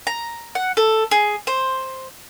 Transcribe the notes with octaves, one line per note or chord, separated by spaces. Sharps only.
A#5
F#5
A4
G#4
C5